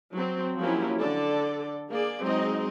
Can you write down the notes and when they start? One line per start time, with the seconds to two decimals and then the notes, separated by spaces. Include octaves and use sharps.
0.15 F#3 C4
0.59 F3 F#3 A#3 C#4 E4 G4
0.99 D3 A4 D5
1.89 A#3 G#4 D5
2.21 F#3 G#3 C4 D#4 D#5